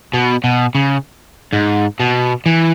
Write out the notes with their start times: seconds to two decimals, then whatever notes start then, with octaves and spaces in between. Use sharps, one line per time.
0.13 B2
0.44 B2
0.75 C#3
1.53 G#2
2.00 B2
2.46 E3